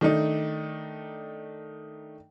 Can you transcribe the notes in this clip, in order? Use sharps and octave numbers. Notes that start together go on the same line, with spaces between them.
D#3 A3 D4 D#4